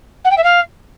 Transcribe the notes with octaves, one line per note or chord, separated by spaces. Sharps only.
F#5
G5
E5
F5